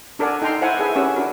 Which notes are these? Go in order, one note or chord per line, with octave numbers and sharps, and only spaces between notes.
D4 A4 A#4 D5 F#5 G#5
D#4 A4 G5 A#5 C6
E4 C5 E5 F#5 G#5
G#4 A4 B4 E5 G#5
C#4 G4 A#4 F#5 E6
D4 F#4 A#4